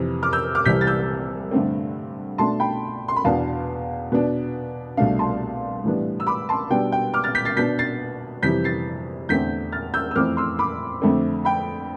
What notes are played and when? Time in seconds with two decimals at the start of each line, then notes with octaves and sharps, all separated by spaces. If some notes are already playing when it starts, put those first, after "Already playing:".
Already playing: F2 C3 E3
0.23 D6 F6
0.33 E6 G6
0.55 D6 F6
0.65 C2 C3 E3 G3 G6 B6
0.81 A6
0.87 E6 G6
1.51 G2 D3 A3 C4
2.38 B2 A3 D4 A5 C6
2.60 G5 B5
3.08 C6
3.16 B5
3.24 E2 B2 B3 D4 F5 A5
4.12 B2 B3 D4
4.97 C2 B2 A3 D4 F5
5.19 A5 C6
5.84 A2 E3 G3 B3 D4
6.20 E6
6.27 B5 D6
6.49 A5 C6
6.70 B2 G3 B3 D4 G5
6.92 G5
7.14 D6 F6
7.24 F6 A6
7.35 G6 B6
7.45 A6 C7
7.56 B2 B3 D4 G6 B6
7.79 A6 C7
8.42 F2 C3 E3 G3 G6 B6
8.64 A6 C7
9.29 E2 D3 A3 C4 G6 B6
9.72 F6 A6
9.94 E6 G6
10.11 E6
10.16 F2 E3 A3 C4 D6 F6
10.37 C6 E6
10.59 B5 D6
11.02 F2 D3 A3 C4
11.45 G5 B5